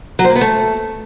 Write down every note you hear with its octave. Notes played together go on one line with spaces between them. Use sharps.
F#3
C5
A#3
B3
A3